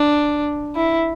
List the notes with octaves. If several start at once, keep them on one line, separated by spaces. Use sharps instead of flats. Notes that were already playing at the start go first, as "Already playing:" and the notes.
Already playing: D4
E4